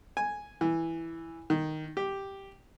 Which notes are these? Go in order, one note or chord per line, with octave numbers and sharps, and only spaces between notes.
G#5
E3
D#3
G4